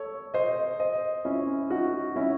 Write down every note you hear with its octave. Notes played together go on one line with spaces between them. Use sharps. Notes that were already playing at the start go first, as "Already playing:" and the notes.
Already playing: A4 C#5
C5 D#5
C5 D#5
C#4 E4
D#4 F#4
C#4 E4